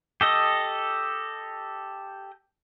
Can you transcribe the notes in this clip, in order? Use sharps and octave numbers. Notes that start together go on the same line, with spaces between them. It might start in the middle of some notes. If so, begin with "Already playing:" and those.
G4 A4 D#5